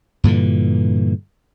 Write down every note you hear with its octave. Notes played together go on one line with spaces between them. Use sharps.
G2 A#2 D3 E3